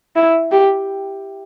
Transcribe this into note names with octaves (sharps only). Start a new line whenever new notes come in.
E4
G4